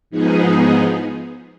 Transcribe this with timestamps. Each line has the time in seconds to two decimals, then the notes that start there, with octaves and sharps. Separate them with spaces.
0.10 G#2 F3 B3 D#4 G#4